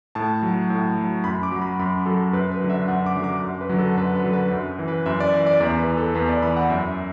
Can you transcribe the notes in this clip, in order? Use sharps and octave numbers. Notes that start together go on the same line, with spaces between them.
A2 A5
F#3
A2
F#3
F#2 B5
D6
F#3
B5
F#2 B5
F#3 A4
F#2 B4
B4
D3 F#3
E5
F#2 F#5
D6
D3 F#3
D6
F#2
B4
D3 F#3
A4
F#2 B4
B4
D3 F#3
B4
F#2
E3
B4
F#2 E5
D5
E3
D5
E2 D5
B4
E3
A4
E2 B4
D5
E3 B5
F#5
F#2 E5